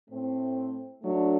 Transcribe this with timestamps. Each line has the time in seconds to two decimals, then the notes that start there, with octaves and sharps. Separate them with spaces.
0.10 A2 A3 C4
1.03 F#3 A3 D4